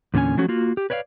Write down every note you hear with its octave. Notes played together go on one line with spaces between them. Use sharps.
E2 A#2 D3 C#4 G#5
F3 F#3 A3 C#4 F#4
A#3 F4 F#4
G4
B4 C#5 D5 E5 F5